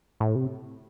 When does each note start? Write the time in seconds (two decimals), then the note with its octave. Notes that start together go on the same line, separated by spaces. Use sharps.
0.20 A2
0.35 C3